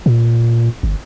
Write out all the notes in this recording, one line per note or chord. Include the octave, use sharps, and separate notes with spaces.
A#2
G1